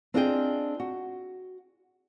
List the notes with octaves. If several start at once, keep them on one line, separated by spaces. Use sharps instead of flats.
C4 D4 F4 G#4 D#5 G5
F#4